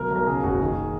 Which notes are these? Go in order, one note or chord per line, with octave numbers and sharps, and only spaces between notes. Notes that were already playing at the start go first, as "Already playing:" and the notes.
Already playing: B1 A#4
B1
A#4
C#3 G#4
F#1 F#4
D#3 G#4